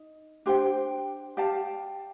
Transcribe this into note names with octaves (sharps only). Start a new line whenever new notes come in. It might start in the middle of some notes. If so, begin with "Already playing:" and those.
Already playing: D#4
D4 G4 C5 G5
G4 D5 F5 A5